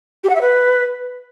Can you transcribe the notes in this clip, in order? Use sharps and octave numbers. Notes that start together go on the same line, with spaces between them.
G4
F#5
E5
B4